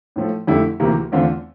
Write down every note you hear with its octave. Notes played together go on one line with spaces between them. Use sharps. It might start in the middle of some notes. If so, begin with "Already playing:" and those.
A2 F3 A3
F2 D3 A3 E4 G4
D2 C3 E3 A#3
E2 D3 A3 C4 F4